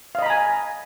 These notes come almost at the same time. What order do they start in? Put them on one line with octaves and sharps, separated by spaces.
F5 D#5 B5 A#5 G#5